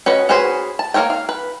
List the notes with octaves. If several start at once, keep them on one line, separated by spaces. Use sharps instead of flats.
C#4 F#4 B4 D#5
C#4 F#4 G#4 B4 C5
A5
A#3 A4 A#4 C#5 G5
F5
B4